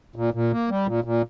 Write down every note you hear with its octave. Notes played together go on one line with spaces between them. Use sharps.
A#2
A#2
A#3
G3
A#2
A#2